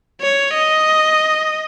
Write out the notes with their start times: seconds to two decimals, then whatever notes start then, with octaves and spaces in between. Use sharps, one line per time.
0.21 C#5
0.54 D#5